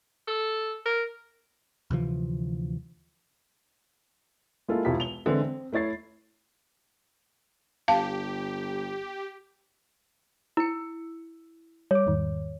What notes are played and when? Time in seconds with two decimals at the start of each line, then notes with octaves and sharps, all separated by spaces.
0.27 A4
0.85 A#4
1.91 D2 C3 E3 F3
4.68 G#3 A#3 E4 F4 A4
4.85 E1 C2 E4 F4 G4 B6
5.00 F7 G7
5.26 D3 E3 G#3 C4 D4
5.42 C4
5.72 A3 E4 C#5 A6 C7
7.88 G1 G4 F5 A5
10.57 E4 E6 C#7
11.91 G3 C#5 D6
12.06 E2 G#2 D#3